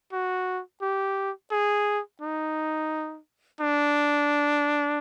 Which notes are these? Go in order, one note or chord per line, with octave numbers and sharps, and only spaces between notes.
F#4
G4
G#4
D#4
D4